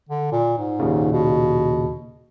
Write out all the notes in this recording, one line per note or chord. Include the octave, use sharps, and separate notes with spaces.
D3
A#2
G#2
D#2 A#2 C#3
B2